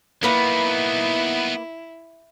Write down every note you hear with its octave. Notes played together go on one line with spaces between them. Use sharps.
A#3 B3 D#4 E4 B4 F#5